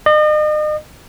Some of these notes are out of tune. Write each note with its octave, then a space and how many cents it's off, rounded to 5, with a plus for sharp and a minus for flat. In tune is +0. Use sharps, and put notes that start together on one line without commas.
D#5 -40